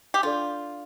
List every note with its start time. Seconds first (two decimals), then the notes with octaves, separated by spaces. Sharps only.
0.14 G4
0.23 D4 F4 A4 D5